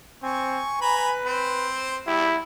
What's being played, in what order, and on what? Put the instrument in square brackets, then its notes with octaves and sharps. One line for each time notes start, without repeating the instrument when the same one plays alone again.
[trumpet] C4 [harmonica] G#5 C#6
[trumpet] B4 [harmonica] G#5 A#5 B5
[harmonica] C4 C5
[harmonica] G3 G4 [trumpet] E4